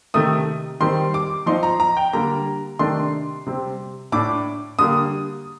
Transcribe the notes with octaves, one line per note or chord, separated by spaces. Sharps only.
C3 D#3 A3 D#6
D#3 G3 C4 C6
D6
F3 C4 D#4 C6
A#5
A#5
G5
D3 G3 A#3 A#5
C3 D#3 A3 D4 C6
C3 G3 C4
A2 A3 D4 D6
D3 G3 A#3 D#6